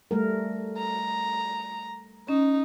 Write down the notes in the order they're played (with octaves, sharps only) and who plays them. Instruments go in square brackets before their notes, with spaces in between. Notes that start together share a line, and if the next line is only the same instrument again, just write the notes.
[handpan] G3 A3 A#4
[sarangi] A#5
[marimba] C#4 [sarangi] D#4